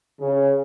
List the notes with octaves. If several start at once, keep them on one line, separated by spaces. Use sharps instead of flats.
C#3